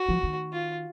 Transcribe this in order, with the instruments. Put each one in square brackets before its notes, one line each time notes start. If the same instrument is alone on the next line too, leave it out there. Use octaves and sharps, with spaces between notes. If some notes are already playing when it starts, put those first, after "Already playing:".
Already playing: [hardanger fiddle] F#4
[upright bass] F3
D#3
[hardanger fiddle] F4